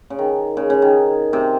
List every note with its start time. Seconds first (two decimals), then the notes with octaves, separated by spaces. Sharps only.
0.10 C#3
0.19 D#3
0.57 C#3
0.70 C#3
0.82 D#3
1.33 C3